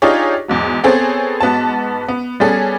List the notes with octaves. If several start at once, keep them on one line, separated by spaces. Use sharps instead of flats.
D4 D#4 F4 G4 G#4 C#5
E2 G#2 F#3
B3 C4 G#4 A4 C5 C#5
G#2 B3 F#4 A5
B3
G3 B3 C#4 G#4 A4